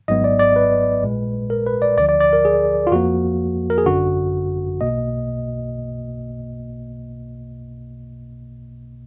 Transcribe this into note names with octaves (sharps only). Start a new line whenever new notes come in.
G#1 G#2 F#3 B3 D#5
D5
D5
B4
A#1 A#2 G#3
A#4
B4
D5
D2 D3 F3 D5
D5
D5
A#4
G#4
F4
F2 F3 A#3 F#4
A#4
G#4
G#1 F#2 D3 F#4
B1 B2 A#3 D#5